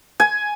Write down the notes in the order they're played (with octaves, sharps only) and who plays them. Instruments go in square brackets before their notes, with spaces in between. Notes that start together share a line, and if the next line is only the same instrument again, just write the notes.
[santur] G#5